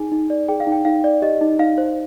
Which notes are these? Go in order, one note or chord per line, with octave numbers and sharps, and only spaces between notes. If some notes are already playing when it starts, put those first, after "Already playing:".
Already playing: D#4 G#4 G#5
D#4
D5
G#4 G5
F5
D#4
G5
D#4 F5
D5
G4 D#5
D#4
D#4 F5
C5